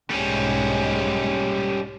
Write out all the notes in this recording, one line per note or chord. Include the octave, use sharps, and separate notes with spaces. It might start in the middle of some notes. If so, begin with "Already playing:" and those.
B1 G#2 G3 G#3 C#4